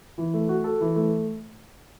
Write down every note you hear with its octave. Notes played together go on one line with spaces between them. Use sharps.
E3
A3
F#4
A4
E3
A3